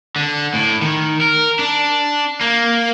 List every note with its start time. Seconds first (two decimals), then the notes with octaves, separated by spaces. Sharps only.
0.16 D3
0.54 A2
0.82 D#3
1.21 A#4
1.59 D4
2.41 A#3